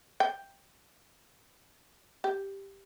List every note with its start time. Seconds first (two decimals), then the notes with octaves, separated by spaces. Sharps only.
0.20 G5
2.24 G4